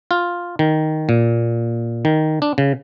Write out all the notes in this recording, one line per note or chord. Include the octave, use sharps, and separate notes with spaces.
F4
D#3
A#2
D#3
D4
C#3